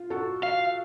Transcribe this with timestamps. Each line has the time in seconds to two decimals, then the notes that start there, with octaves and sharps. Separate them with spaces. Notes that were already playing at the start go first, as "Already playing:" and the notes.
Already playing: F4
0.10 F#4 A4
0.43 F5